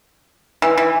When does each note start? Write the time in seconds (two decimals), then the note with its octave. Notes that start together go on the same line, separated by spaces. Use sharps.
0.62 E3
0.78 E3